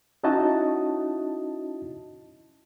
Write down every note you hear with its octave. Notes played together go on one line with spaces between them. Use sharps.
C#4 D#4 E4 F#4 D#5 A5